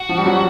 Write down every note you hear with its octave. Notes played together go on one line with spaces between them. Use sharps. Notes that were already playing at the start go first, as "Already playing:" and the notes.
Already playing: F#4
F3
G3
F#3